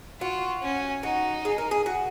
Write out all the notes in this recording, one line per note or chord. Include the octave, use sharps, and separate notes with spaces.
F4 F#4
C#4
D#4 F#4
G#4
A#4
G#4
F#4